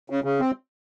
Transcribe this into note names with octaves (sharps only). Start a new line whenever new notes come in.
C#3
C#3
C4